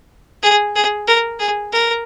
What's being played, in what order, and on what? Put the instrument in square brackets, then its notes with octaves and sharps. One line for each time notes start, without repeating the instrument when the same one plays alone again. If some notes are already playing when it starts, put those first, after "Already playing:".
[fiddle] G#4
G#4
A#4
G#4
A#4